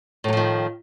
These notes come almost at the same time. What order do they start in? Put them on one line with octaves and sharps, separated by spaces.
A2 F#3 F3 D#3